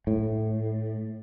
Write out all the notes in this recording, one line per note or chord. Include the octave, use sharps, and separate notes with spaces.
A2